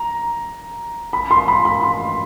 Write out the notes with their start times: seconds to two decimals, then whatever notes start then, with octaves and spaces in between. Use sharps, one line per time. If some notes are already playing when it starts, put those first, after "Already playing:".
Already playing: A#5
1.13 B5
1.31 C6
1.48 B5
1.65 B5
1.83 C6